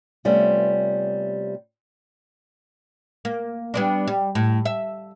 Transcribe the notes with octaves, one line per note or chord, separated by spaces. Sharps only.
C3 G3 A3 B3 C#4 F4
A#3
G3 B3 D4
G3
A2
E5